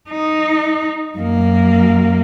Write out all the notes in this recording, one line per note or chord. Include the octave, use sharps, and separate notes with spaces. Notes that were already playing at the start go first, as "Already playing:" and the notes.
D#4
F#2 A#3